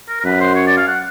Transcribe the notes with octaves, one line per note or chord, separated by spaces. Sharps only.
A#4
A#4
F#2 B4
C5
C#5
D5
F5
F#5